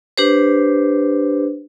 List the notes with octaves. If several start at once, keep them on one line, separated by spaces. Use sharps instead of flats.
D4 G4 B4 C5